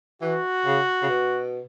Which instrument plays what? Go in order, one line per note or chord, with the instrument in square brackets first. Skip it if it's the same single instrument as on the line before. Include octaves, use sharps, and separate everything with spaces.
[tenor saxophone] E3 [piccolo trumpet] F#4
[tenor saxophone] C#3
C#3
B2